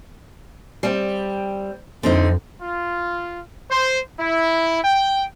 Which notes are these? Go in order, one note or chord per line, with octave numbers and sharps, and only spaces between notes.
G3 C4
F2 D3 C4 D#4
F4
C5
E4
G5